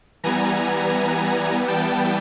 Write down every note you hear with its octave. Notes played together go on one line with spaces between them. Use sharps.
E3 G3 B3 G#5 A#5
G5 A5